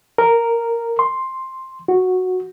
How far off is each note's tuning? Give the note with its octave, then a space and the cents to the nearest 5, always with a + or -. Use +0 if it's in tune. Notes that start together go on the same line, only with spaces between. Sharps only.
A#4 -5
C6 +5
F#4 -5